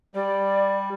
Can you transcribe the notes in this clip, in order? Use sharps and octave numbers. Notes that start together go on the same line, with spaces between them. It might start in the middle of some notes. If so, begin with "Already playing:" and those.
G3 D5